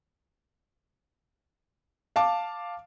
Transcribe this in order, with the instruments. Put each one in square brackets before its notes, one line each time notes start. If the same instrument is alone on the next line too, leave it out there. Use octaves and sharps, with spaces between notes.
[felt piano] F5 A5 D6